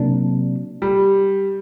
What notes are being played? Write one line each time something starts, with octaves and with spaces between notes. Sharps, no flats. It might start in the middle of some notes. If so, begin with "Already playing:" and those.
Already playing: C3 F#3 A#3 D4
G3